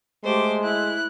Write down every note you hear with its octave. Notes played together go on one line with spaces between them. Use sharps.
G#3 A3 G4 C5 D6
E4 F#6